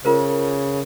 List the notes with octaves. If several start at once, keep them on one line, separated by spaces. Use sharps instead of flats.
C#3 F4 A#4 C5